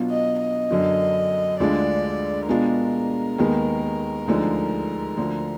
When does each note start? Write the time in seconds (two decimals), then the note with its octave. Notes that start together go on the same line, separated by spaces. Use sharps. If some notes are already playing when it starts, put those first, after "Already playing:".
Already playing: B2 F#3 D4 F4
0.10 D#5
0.40 D#5
0.71 F#2 D3 F#3
1.60 D2 D3 G#3 D4 F4 D5
2.49 B2 G#3 D4 F4 A#4
3.38 D#2 D#3 G#3 B3
4.27 D2 D3 F3 G#3 D#4
5.17 D2 D3 F3